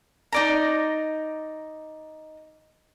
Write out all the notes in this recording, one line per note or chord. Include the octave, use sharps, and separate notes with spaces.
D#4 D5 A#5